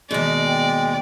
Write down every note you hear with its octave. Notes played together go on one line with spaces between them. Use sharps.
D#2 B2 G#3 D5
G5